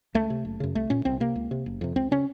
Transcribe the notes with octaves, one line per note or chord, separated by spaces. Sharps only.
C#2 A3
C3
F#1
F#2 C#3
C2 A3
A#2 C#4
C2 C4
C3 A#3
C#2
C3
F#1
F2 C3
C#2 C4
C#3 C#4